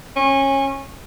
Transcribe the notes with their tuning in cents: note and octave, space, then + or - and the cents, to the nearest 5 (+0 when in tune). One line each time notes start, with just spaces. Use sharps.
C#4 -25